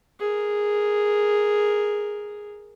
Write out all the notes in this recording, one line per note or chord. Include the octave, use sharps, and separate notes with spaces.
G#4 A#4